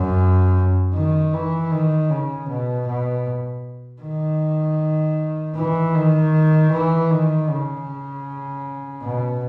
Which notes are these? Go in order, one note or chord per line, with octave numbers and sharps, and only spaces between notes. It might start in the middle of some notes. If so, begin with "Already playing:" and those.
Already playing: F#2
D#3
E3
D#3
C#3
B2
B2
D#3
E3
D#3
E3
D#3
C#3
B2